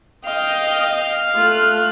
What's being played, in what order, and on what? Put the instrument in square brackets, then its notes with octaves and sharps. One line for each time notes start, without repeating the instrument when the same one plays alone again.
[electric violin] D#5 G5 [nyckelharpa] F5
[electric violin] A3 F#6 [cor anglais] F4